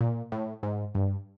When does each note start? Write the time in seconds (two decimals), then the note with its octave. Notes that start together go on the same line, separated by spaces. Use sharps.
0.01 A#2
0.32 A2
0.63 G#2
0.95 G2